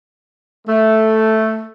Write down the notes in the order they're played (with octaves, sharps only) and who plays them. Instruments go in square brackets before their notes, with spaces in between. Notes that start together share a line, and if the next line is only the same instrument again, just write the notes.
[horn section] A3